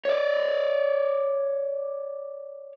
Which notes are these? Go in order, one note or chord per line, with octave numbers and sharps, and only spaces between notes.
C#5 D5